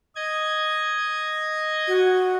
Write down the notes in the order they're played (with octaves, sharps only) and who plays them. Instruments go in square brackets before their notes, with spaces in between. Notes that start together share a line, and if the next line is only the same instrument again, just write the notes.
[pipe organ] D#5 G#6
[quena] F#4